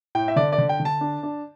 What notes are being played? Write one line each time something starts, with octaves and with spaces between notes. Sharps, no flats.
A2 G5
E5
D3 D5
D5
D3
G5
D3
A5
D4
D4